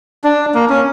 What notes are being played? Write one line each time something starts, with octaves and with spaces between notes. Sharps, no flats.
D4
A#3
C#4